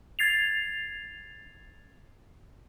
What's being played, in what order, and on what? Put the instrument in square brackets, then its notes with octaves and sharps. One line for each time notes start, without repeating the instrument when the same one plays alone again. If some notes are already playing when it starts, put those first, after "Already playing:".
[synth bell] G#6 A6 C7 F7